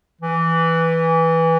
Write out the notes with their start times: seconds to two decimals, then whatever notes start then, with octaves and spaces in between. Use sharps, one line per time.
0.21 E3